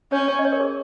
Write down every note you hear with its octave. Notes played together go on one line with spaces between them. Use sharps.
C#4 C#5
C#5
D#5
C#5
A#4
G#4